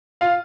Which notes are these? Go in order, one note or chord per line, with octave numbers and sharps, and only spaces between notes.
F4 F5